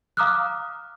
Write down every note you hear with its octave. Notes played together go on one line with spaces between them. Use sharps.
F5 A#5 D6 D#6 F6 F#6